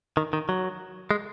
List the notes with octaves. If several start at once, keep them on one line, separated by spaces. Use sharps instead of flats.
D#3
D#3
F#3
G#3